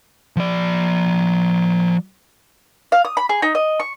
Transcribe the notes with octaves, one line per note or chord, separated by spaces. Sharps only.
F3 D5
F5
D#6
B5
G#4
D#4
D#5
C#6